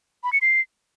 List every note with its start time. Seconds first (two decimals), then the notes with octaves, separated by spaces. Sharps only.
0.24 B5
0.33 C#7
0.42 C7